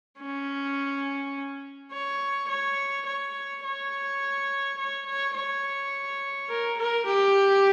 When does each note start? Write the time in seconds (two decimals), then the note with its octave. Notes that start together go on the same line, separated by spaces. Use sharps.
0.20 C#4
1.92 C#5
2.49 C#5
3.07 C#5
3.64 C#5
4.78 C#5
5.06 C#5
5.36 C#5
6.50 A#4
6.78 A#4
7.06 G4